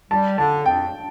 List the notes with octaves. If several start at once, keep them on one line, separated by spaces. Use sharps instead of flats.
G3 A5
D3 A5
F2 G5